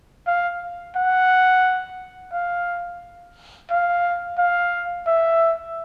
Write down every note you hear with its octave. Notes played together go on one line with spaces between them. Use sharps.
F5
F#5
F5
F5
F5
E5